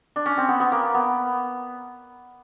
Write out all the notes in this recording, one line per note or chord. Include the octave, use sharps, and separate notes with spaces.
D4
C#4
C4
B3
B3
A#3
B3